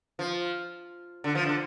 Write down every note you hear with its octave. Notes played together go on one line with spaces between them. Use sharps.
F3
D3
F3
D3